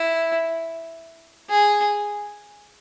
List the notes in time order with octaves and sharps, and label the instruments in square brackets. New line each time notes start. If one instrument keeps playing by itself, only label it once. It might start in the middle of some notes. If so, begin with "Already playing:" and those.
Already playing: [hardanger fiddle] E4
G#4